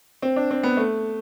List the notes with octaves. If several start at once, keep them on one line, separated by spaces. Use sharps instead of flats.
C4
D4
C4
B3
A3